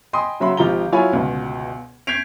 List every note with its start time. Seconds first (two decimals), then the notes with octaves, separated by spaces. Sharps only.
0.13 D#5 G5 G#5 B5 C6 D#6
0.40 C#3 F#3 E5 B5 C6
0.57 G#1 F3 F4 G4 A#5 G7
0.92 F#3 E4 F4 C#5 G#5 B5
1.12 G1 C#2 B2
2.07 G6 G#6 B6 C7 D7 F7